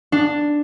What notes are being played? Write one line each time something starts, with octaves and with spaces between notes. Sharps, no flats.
D4